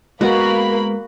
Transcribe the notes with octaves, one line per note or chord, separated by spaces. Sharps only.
G#3 A#3 B3 F#4 A#4 B5